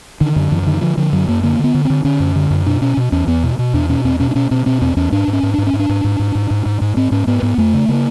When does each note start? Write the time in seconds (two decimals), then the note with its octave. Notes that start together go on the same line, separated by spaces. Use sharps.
0.21 D3 D#3
0.36 F#2 D3
0.52 F#2 E3
0.62 E3
0.66 D3 D#3
0.82 D3 F3
0.97 D3 F3
1.12 F#2 F#3
1.28 F#2 A#3
1.43 D3 A#3
1.59 D3 B3
1.74 D3
1.85 C4
1.90 D3
2.05 D3 C#4
2.20 F#2
2.36 D3
2.50 F#2
2.66 B2 D4
2.81 B2 C#4
2.97 B2
3.12 E2 C#4
3.27 E2 B3
3.43 B2
3.59 B2
3.74 E2 D4
3.89 B2 C#4
4.04 E2 C4
4.20 B2 C#4
4.31 D4
4.35 B2 C#4
4.51 B2 C4
4.66 B2 C4
4.81 E2 C4
4.97 E2 C#4
5.12 G#2 D4
5.28 G#2
5.33 C#4
5.43 G#2
5.54 G#2 D4
5.67 C#4
5.73 G#2
5.79 D4
5.89 G#2
6.04 G#2
6.19 G#2
6.35 G#2
6.51 G#2
6.66 G#2
6.81 G#2
6.96 G#2 C4
7.11 G#2 C#4
7.27 G#2 B3
7.42 G#2 B3
7.58 F2 A3
7.74 C#3
7.89 C#3 A#3